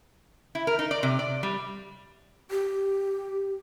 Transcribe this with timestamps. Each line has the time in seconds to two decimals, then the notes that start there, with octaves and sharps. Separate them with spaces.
0.55 E4
0.67 A#4
0.79 D#4
0.91 D5
1.03 C3
1.19 D5
1.43 G3
2.51 G4